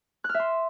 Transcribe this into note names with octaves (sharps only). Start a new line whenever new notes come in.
F#6
F6
E5
C6